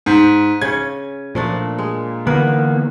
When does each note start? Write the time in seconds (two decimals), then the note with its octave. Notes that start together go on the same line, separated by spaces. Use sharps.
0.06 G#2
0.61 C#3 C#4 G#6
1.35 A#2 F3 A3 D4
1.79 G#3
2.27 D3 E3 A#3 B3 A#4 B4